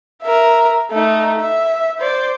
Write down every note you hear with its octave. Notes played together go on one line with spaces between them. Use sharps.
A#4 E5
A3 D#4
E5
C5 D5